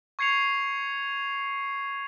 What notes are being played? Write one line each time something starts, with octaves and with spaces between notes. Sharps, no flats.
C#6 G#6 C7 C#7 F7